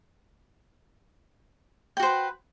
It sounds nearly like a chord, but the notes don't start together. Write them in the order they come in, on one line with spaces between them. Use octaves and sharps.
G5 F#4 C5 B4